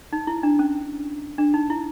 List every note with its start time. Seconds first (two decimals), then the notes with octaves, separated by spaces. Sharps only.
0.13 D#4
0.27 E4
0.43 D4
0.59 C#4
1.38 D4
1.54 D#4
1.70 E4